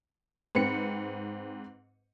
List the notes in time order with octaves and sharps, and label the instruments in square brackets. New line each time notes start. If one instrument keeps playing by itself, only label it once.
[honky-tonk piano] G#2 C4 B4 C#7